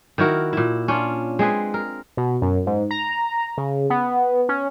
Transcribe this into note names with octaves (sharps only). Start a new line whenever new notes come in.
D#3 E4 F#4 A#4
A#2 E4
C#4 D4 F4
G#3 C4 G#4 B4
A#4
B2
F#2
G#2
A#5
C#3
B3
C#4